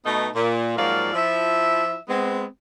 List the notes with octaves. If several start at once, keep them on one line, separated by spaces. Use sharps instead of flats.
B2 A3 B3 D#4
A#2
G#2 F3 F#3 A#3 D5 F5
F3 E4 E5
G#3 B3 C4